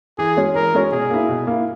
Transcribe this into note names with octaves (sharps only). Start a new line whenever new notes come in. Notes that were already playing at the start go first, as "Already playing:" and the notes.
E3 G#4
G#3 C#4 F#4 C#5
E3 A#4
G#3 C#4 F#4 C#5
B2 G#4
A#3 E4
B2
A#3 E4